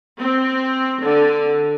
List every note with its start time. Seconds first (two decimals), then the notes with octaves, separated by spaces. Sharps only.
0.20 C4
1.02 D3